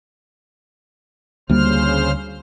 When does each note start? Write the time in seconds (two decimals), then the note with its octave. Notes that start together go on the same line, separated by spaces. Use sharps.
1.50 D2 C#3 G3 A#3 C5 F6